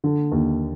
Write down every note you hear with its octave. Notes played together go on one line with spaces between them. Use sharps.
D3
D#2